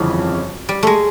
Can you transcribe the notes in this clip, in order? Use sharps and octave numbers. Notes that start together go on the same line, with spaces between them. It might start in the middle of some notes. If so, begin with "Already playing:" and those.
Already playing: G1 F2 C#3 E3 F#3
G3
G#3 A3